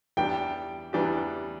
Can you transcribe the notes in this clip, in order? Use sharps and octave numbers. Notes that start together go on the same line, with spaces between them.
E2 E3 G3 D4 G4 G5
E2 E3 G3 D4 G4